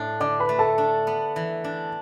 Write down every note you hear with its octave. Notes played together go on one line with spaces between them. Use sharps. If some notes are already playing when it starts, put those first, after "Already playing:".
Already playing: A2 D4
D3 D5 D6
B4 B5
A3
A4 A5
D4
B3
E3
D4